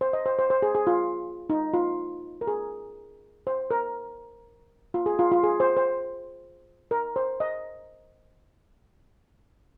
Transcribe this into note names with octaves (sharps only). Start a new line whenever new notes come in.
C5
D#5
C5
C5
C5
G#4
G#4
F4
D#4
F4
A#4
G#4
C5
A#4
F4
G#4
F4
F4
G#4
C5
C5
A#4
C5
D#5